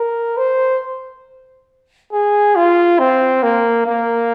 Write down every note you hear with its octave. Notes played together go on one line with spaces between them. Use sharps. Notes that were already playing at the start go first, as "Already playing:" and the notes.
Already playing: A#4
C5
G#4
F4
C4
A#3
A#3